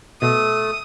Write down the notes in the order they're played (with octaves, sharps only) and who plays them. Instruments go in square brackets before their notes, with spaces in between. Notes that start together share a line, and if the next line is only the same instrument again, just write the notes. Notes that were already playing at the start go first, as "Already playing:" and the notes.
[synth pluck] B2 [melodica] A3 [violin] D#6